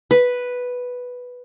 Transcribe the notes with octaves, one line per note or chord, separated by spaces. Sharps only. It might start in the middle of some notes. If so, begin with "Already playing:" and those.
B4